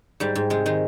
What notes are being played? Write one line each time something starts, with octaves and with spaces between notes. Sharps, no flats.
G#2 G3
G#2
C3 G#3
D#3 G#3